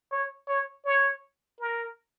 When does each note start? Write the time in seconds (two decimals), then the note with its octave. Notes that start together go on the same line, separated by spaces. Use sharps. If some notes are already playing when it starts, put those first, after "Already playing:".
0.12 C#5
0.48 C#5
0.85 C#5
1.60 A#4